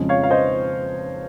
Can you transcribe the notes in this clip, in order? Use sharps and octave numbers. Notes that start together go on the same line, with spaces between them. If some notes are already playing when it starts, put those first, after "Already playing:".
Already playing: F2 C#3 F3 G#3
C#5 F5
F5
C5 D#5